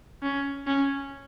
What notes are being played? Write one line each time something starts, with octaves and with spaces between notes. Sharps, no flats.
C#4
C#4